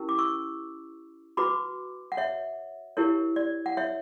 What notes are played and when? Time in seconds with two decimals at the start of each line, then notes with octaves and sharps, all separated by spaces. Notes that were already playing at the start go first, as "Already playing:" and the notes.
Already playing: C#4 E4 G4 A#4
0.09 D6
0.18 C#6 E6
1.37 F#4 B4 B5 D6
2.12 F#5
2.17 C#5 E5
2.97 E4 G4 A#4 C#5
3.36 D5
3.66 F#5
3.77 C#5 E5